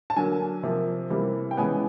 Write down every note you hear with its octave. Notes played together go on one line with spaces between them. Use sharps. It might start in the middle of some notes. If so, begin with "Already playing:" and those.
A5
D3 F#3 A#3 G#5
C3 F3 A#3
C3 E3 G3 A#3
G5
C#3 E3 G#3 B3 G#5